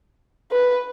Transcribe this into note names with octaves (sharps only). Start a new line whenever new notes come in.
B4